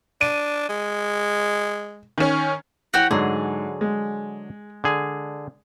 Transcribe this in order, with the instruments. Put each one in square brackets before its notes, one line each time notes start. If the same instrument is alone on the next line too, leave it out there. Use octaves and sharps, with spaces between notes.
[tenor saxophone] D4 [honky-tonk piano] D#7
[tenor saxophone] G#3
[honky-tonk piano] D#3 C#4
[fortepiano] E3 [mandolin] F#4 G4 C#5
[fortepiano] G#2 [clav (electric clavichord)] D3 F#3 [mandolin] G#4
[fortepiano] G#3
[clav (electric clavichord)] D3 G#4